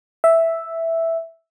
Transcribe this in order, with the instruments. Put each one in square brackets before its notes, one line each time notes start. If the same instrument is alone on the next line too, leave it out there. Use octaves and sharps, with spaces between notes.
[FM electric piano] E5